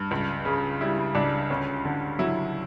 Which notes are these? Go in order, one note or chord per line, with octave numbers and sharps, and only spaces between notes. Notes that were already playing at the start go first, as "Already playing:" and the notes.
Already playing: G2
C#2
C#3
G3 E4
C#2 D4
D2 C#4
D3
F#3 E4